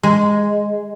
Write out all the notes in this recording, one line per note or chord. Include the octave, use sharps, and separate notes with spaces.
G#3